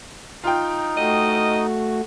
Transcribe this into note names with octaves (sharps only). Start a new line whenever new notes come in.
D#4 F4 G5
A3 F#4 D#5